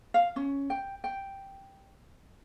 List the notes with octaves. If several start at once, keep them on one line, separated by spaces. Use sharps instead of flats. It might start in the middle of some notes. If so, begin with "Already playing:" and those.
F5
C#4
G5
G5